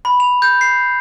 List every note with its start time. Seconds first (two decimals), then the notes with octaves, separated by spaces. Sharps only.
0.05 B5
0.20 F7
0.42 G6
0.61 C7